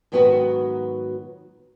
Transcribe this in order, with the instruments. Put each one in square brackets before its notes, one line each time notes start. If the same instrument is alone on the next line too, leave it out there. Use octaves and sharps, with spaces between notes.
[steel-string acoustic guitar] G#2 D#3 F#3 B3 F#4 B4